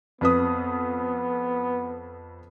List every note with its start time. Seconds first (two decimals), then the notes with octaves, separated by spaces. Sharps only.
0.21 F2 B3 B4 D#6